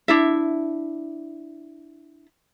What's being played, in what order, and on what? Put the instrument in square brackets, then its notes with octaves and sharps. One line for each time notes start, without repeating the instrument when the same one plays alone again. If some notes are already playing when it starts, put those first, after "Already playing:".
[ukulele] D4 E4 E5